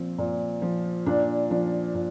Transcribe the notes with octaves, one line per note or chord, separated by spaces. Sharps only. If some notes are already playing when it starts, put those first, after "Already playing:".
Already playing: A#2 F3 C4
A#2
F3
A#2 D4
F3 D4
A#2